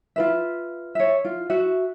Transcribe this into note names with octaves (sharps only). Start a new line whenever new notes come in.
F4 B4 E5
C#5 E5
F4
F#4 E5